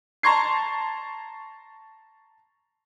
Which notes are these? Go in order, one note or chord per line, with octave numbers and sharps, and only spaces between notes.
A5 A#5 C6 C#6 G#6 C7